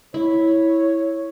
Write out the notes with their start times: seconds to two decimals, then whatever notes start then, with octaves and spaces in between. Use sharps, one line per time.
0.14 E4 C#5